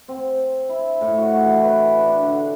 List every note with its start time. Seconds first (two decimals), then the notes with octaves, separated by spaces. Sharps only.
0.08 C4
0.69 E4
1.01 A2
1.18 F#4
1.43 E3
1.64 B4
1.99 D4
2.23 D3